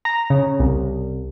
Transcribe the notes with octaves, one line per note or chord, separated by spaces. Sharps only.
A#5
C#3
C2